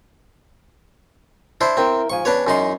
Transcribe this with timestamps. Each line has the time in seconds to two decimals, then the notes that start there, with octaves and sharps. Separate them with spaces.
1.61 D4 E4 C5
1.77 C4 E4 A#4 G5
2.10 G#2 F3 G#5 C#6
2.25 E2 C#4 D4 B4 C#5
2.47 F#2 D#4 C6